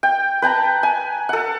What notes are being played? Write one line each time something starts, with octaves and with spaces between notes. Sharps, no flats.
G5
B4 G5 A5 A#5
G#5
A4 F#5